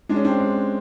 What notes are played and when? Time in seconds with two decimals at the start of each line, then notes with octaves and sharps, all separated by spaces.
0.09 G#3 D4
0.16 C#4
0.25 C4 D4
0.40 G#3